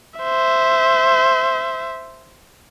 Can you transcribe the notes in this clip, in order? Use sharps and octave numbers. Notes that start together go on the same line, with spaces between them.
C5 E5